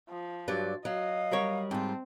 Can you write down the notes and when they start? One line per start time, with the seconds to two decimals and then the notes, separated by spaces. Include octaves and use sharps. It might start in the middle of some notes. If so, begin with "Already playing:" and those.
0.10 F3
0.48 G2 F#3 G4 D5
0.85 F#3 D#5 F5
1.31 G3 A#4 C#5
1.71 G#2 C4 F4 A5